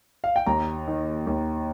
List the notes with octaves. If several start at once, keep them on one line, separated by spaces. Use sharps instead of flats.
F5
G5
D#2 A#5
D#3
D#2